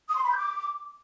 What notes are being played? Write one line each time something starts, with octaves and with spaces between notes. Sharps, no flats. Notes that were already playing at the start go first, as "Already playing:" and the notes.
D#6
C6
B5
G6
D6